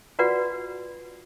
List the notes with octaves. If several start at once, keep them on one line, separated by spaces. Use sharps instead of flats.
F4 F#4 B4 D5 F#5